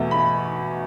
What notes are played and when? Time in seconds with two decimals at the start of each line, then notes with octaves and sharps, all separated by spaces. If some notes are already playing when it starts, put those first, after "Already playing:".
Already playing: E2 B2 A3
0.11 B5